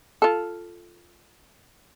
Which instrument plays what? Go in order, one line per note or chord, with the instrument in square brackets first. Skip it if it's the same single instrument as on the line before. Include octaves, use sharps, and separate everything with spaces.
[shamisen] F4 A4